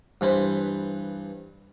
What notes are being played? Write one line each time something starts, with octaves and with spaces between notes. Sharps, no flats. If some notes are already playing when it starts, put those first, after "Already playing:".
G2 E3 B4 C5